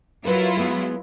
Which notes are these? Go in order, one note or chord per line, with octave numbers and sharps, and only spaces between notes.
F#3 E4 F4 A#4 B4
G#3 B3